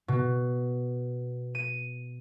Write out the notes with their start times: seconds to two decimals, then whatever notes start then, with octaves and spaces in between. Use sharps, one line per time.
0.08 B2
1.55 D#7